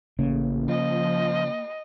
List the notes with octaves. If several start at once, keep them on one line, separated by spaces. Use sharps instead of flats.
A1 C#3 A#3
F3 D#5